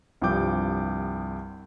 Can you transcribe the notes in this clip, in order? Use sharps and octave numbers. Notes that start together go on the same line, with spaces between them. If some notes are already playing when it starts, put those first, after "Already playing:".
C2 G2 F3 G5 D6 G6